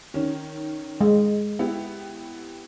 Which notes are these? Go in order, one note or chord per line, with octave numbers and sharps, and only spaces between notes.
D#3 C#4
G#3
B3 E4 G4